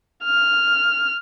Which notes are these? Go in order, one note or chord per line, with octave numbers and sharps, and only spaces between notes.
F6